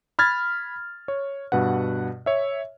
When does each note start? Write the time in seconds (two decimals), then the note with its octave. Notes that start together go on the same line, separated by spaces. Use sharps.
0.19 B5 F6 G#6 A6
1.08 C#5
1.52 G2 B2 B4 F#5
2.26 C#5 E5